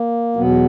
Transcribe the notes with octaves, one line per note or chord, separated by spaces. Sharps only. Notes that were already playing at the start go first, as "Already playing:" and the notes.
Already playing: A#3
E2 B2 F#3 B3